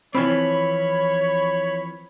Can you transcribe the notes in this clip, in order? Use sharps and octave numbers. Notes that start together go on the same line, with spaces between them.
E3 F3 C4 C#5 B5